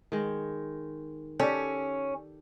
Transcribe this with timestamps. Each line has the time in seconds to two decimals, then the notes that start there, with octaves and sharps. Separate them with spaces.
0.12 D#3 G#3
1.40 C#4 G4 A4